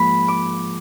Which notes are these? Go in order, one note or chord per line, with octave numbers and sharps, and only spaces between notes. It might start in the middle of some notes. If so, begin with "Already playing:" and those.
Already playing: G#2 F3 A#3 B5
D6